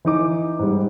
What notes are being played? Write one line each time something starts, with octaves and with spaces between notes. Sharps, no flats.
E3 D#4 D6
G#2 G3